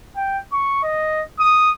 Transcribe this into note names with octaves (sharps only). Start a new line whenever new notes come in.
G5
C#6
D#5
D#6